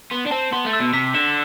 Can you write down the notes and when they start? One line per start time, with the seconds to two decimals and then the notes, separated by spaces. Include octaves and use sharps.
0.11 B3 C6
0.26 D4
0.31 C4 A5
0.53 B3 C6
0.66 A3
0.73 E6
0.81 B2
0.93 C3 B6
1.15 D3 E7